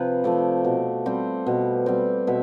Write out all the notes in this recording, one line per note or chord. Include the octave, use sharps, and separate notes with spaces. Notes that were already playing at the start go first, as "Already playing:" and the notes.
Already playing: C3 F3 B4
F3 A3 C4 D5
B2
G3 C4
B2
G3 C4
B2 E5